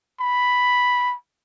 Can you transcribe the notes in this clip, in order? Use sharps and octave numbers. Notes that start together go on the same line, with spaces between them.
B5